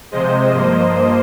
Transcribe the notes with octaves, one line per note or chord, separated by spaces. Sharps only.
C3 F3 G#3 C5 D#5
G2 F3 A#3